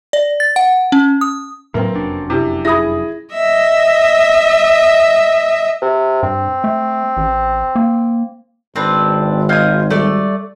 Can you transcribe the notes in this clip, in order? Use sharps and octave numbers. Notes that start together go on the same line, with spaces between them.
D5
A6
F#5
C#4
D#6
D2 A2 F#3 A#3 C4 B4
F1 F#2 D4
C3 E4 G4
E4 G#4 E5 B5 D#6 A#6
D#5 E5
C3
G2 C4
A3
A1
A#3
G#1 C4 D4 B4
F4 D#5 D#6 G6 G#6
G3 A3 D5